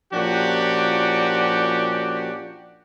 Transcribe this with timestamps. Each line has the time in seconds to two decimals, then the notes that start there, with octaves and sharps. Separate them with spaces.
0.13 A#2 F3 C#4 D4 F#4 G4